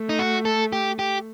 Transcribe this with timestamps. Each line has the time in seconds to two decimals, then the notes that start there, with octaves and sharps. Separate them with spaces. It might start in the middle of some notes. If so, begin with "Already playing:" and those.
Already playing: A3
0.09 D#4
0.19 F#4
0.45 A4
0.73 G4
0.99 G4